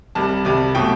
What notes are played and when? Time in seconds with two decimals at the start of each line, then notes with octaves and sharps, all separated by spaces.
0.15 C2 C3 G3 A5
0.45 C2 C3 G3
0.75 B2 F#3 A3 G5